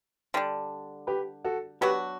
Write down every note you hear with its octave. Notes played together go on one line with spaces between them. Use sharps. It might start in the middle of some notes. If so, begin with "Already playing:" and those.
D3 G3 D4
G4 B4
F#4 A4
F#3 B3 D4 F#4 G4 B4